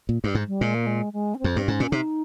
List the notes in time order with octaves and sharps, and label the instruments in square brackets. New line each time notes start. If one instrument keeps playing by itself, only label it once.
[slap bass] A#2
G2
G#2
[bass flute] G3
[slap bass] A#2 [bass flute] G#3
[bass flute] A#3
G#3
G#3
C#4
C4
[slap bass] F2
G2
[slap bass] G#2 [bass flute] C#4
[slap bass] A#2
[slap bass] C3 [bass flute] D#4